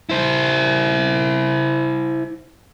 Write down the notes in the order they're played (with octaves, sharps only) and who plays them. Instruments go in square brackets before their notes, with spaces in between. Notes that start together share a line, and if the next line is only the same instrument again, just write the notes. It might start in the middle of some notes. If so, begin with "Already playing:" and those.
[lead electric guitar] E4 C5